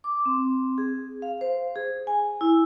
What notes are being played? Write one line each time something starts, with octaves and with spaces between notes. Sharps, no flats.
D6
C4
G#4
F5
C5
G#4
G#5
E4